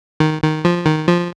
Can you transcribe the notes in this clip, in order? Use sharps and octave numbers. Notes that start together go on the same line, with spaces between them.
D#3
D#3
F3
D#3
F3